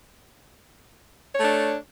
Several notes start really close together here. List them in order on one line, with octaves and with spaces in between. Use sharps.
C#5 A3 D4